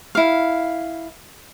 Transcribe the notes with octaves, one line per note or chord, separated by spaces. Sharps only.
E4 F5